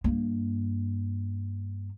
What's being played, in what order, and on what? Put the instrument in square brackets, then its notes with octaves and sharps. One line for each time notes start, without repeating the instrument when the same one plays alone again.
[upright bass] G2 A#3